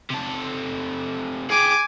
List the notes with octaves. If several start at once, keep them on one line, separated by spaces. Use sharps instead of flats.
C3 A4
G#4 G5 G#5 D6